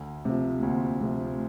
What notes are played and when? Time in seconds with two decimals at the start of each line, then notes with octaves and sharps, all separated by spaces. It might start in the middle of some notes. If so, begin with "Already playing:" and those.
Already playing: D2
0.25 C3 F3 A3
0.62 D2 A#3
1.01 C3 F3 A3